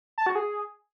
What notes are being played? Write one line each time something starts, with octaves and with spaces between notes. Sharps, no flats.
A5
F#4
G#4